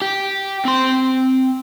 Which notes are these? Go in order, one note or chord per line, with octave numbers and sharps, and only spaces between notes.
G4
C4 C6